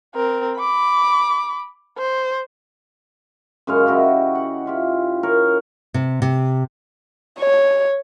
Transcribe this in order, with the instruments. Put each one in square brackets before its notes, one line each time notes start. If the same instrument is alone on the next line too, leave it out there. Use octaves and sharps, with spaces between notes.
[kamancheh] C4 A#4
B5 D6
C5
[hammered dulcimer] F#2 C#3 G#3 F5
E4 F#4 G4 D#5
F#5
E4 F4 G4
A#4 C#5
[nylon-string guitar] C3
C3
[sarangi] C#5